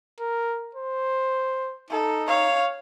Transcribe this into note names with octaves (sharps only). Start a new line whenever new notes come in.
A#4
C5
D#4 A4
C#5 F5